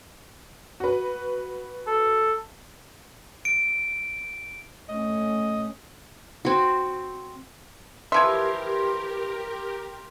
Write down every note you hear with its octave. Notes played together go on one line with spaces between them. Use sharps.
F#4 B4
A4
D7
A3 C#4 D#5
C4 F#4
E3 F3 G4 A#4 E5 C6 G#6